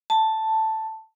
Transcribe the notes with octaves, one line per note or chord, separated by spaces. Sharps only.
A5